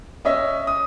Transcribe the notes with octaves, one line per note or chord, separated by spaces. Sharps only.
C#4 D#5 E5
D#6